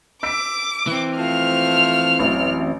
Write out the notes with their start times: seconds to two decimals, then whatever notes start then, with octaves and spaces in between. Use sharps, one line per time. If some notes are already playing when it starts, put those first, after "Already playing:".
0.23 D6 E6 B6 D7
0.87 E3 C4
1.18 F3 A3 F4 F6 F7
2.19 A1 F#2